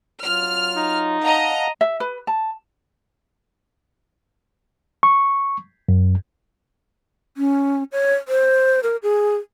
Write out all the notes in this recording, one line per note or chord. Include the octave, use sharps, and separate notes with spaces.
F#3 F4 F6
D#4
D#5 F5 F#5 A5 A#5
E5
B4
A5
C#6
F#2
C#4
C#5
C5
A#4
G#4